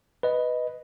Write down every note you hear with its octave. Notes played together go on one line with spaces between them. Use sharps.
B4 D#5